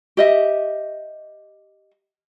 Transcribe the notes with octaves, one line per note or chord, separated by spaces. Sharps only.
G4 D#5 E5